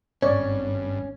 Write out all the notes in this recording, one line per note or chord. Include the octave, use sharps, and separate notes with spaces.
G#1 G2 C#4 C#5 D5